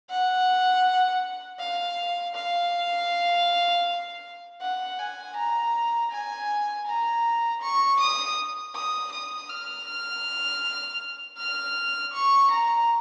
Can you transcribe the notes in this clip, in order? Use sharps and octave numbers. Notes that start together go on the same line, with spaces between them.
F#5
F5
F5
F#5
G#5
A#5
G#5
A#5
C#6
D#6
D#6
D#6
F6
F6
F6
C#6
A#5